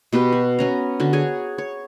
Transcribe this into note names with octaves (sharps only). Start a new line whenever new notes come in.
B2 B3 G4 B4
F#4
B3 C#4 A#5
D3 F#4
G#4 C#5 G#5
C#5